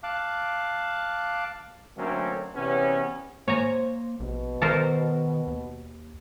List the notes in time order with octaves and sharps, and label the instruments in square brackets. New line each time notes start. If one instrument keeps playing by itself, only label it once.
[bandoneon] F5 A5 D6 F#6
[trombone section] D3 F#3 A3 A#3 C4 C#4
E2 C3 B3 C#4
[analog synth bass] A#3 [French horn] C5 [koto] C#5 G#5 A#5
[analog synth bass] A#1 [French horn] B2
[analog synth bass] D#3 [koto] A4 A#4 C5
[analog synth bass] D#2